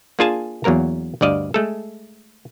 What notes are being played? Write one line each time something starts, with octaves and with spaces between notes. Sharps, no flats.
A#3 D4 F4 G#4 G#5 A5
E2 F#3 A#3 A#4 A#5
D2 G2 D5 D#5 F5
G#3 A3 A4